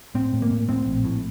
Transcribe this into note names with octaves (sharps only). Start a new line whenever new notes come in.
A2 C4
A2
A#3
A2
A2 C4
A#1
A2